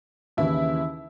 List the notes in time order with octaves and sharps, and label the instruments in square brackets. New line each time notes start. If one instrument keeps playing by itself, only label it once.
[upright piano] D#2 C#3 E3 [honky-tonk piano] E4